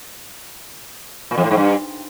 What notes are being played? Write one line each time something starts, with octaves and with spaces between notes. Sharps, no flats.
A#2
F2
A2
G#2
G2